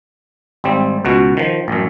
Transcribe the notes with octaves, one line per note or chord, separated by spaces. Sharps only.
G#1 G3 C4
C#2 B2 F#4
D#3 F3
A1 F#2